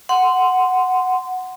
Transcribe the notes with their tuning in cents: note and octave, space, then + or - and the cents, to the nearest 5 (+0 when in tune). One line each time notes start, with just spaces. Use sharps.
F#5 +0 C6 -15